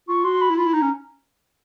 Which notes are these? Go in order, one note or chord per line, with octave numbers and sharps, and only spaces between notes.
F4 C#6
F#4 C6
B5
E4
F4 B5
E4
D#4 A#5
C#4